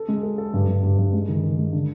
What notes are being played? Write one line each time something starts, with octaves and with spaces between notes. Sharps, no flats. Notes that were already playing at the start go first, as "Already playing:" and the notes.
Already playing: A4
G#3
A4
A4
G2
G2
G2
G2
G#3
D#3
D#3
G#3
D3